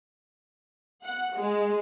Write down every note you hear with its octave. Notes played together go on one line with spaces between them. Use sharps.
F#5
G#3